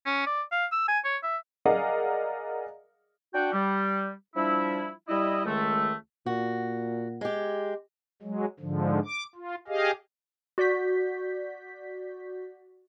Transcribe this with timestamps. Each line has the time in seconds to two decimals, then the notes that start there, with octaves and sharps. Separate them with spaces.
0.06 C#4
0.26 D5
0.52 F5
0.72 E6
0.88 G#5
1.04 C#5
1.23 E5
1.65 G#4 A#4 D5 D#5 F5 F#5
3.34 D4 F#4 G5
3.52 G3
4.36 F3 G3 D4 E4
5.09 G3 E4 D#5
5.46 C#2 D#3 G#3 A3
6.26 A#2 F#4
7.21 G#3 G4
8.23 F#3 G#3
8.60 G#2 D3 F3
9.05 D6
9.35 F4
9.68 G4 G#4 D#5 F5
10.58 F#4 D5 G6 B6